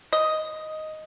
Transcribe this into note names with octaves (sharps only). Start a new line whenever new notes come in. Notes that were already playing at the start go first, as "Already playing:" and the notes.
D#5